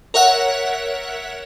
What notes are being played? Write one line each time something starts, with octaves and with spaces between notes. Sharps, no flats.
A#4 C#5 E5 F#5 F#6